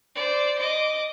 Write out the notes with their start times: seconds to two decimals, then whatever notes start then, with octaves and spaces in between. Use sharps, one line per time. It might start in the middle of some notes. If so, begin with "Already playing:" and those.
0.15 C5 D5
0.59 D#5 D6